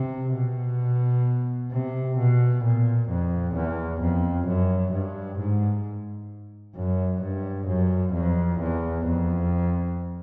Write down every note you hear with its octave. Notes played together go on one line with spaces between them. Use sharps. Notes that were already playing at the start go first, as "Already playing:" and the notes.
Already playing: C3
B2
C3
B2
A#2
F2
E2
F2
F#2
G2
G#2
F#2
G2
F#2
F2
E2
F2